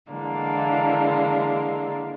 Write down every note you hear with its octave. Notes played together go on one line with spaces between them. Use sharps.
D3 E3 G#3 A#3 D4